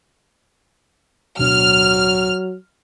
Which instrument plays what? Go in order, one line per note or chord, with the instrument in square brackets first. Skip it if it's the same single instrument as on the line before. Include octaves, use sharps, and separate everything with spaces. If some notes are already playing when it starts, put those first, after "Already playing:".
[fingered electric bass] D1 B2 D4 [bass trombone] F#3 [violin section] F6